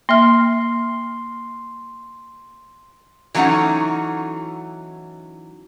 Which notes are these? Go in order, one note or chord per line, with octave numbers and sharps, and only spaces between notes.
A#3 E5 C6 F6
E3 F#3 A3 C#4 D#4 F#5